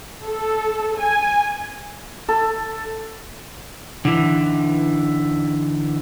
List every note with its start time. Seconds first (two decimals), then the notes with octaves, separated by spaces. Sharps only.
0.24 A4
0.99 G#5
2.29 A4
4.05 D3 E3